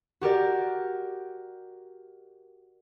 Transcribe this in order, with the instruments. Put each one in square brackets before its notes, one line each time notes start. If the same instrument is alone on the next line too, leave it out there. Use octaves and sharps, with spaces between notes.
[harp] F#4 G4 A#4 D5